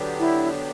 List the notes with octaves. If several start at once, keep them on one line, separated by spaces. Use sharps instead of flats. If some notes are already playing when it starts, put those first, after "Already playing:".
Already playing: D3 F#3 B3 D4 G4
E4